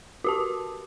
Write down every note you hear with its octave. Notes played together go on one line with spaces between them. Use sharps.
F#4 G4 A5